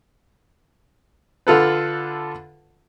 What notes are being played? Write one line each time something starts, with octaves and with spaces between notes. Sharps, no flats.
D3 F4 A4 B4